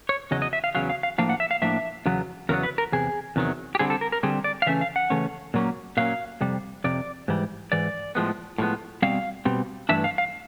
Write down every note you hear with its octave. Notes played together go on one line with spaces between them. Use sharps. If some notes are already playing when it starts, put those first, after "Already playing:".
C#5
E2 C#3 F#3 D#5
D#5
E5
F5
E2 C#3 F#3 F5
F5
F5
A2 F3 A#3 D4 F5
F#5
E5
F5
A2 F3 A#3 D4 E5
E2 C#3 F#3 B3
E2 C#3 F#3 B3 A#4
B4
A#4
E2 C3 G#4
E2 C3 D#3 F#3
G4
D3 G3 C4 G#4
A4
A#4
A#4
D3 G3 C4 G#4
D5
F5
C#3 E3 A3 C#4 E5
F5
F#5
C#3 E3 A3 C#4
A#2 F#3 A#3 C#4
A#2 F#3 A#3 C#4 F5
F2 C3 G3
F2 C3 D5
G#2 E3 G3
G#2 E3 D5
A2 F3 G#3 B3
A2 F3 G#3 B3
B2 G3 C4 F5
B2 G3 C4
G2 E3 A3 D4 E5
F5
F5